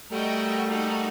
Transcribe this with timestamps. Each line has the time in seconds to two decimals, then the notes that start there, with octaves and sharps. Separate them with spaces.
0.11 G3 A3 F#4 A#4 D#5 G5
0.68 A#3 D#4 F#4 A4